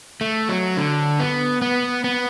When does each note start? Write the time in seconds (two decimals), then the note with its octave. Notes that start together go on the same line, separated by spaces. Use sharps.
0.21 A3
0.49 F#3
0.77 D3
1.20 B3
1.62 B3
2.04 B3